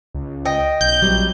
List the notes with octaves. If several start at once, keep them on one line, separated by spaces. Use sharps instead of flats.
C#2
D#5 G5
B1 G6
A#1 F#3 G3 C4